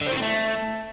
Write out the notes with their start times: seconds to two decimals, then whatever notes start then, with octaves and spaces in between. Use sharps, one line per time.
0.01 D3
0.06 C4
0.12 A2
0.17 C4
0.22 A3